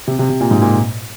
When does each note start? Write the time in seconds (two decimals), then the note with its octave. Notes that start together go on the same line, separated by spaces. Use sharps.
0.08 C3
0.19 C3
0.29 C3
0.40 A#2
0.51 G#2
0.62 A#2